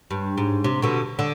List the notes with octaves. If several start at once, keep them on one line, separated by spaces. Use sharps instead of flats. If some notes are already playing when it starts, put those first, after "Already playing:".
G2
G#2
C3
B2 D3
D3